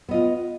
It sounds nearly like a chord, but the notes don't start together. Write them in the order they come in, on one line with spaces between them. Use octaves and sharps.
B3 D#5 F4